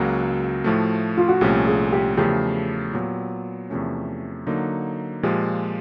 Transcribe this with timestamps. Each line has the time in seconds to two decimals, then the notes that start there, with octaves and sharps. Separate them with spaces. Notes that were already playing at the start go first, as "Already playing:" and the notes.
Already playing: C#2 C#3 F#3 A#3 F#4
0.64 A2 F3 A3
1.17 F4
1.28 F#4
1.41 C2 A#2 F3 A3 C#4 G4
1.67 G#4
1.92 G4
2.17 E2 C#3 F3 A3 G4
2.93 A#2 F#3 B3
3.70 E2 C3 F3 A3 C#4
4.47 D3 F#3 A#3 D#4
5.23 A#2 F3 G#3 G4